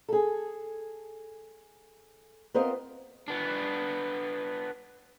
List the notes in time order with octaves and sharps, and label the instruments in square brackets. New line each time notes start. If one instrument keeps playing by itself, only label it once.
[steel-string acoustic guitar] G#4 A4
B3 C4 F4 A#4 C5 D#5
[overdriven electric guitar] B3 D4